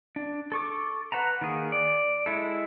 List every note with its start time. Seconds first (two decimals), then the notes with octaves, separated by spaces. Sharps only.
0.16 D4
0.52 A4 C#6 D6
1.12 B4 F#5 A5 A#5
1.41 D#3 A#3 G#4
1.72 D5
2.26 G#3 E4 A4